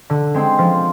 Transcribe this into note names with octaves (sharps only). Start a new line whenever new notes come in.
D3
G#3 C4
F3